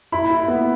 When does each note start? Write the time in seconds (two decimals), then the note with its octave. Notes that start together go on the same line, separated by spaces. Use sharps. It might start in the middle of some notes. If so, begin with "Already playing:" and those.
0.12 E4 B5
0.30 E4
0.48 B3